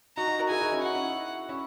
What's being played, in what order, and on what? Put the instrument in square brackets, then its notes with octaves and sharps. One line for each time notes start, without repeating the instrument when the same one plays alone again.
[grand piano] D#4 F#4 [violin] A#5
[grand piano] D#4 F#4
F#4 A#4
[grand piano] E4 G#4 [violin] G#5
[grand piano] D#4 F#4
C#4 E4
[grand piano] D#4 F#4 [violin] F#5
[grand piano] C#4 E4
C#4 E4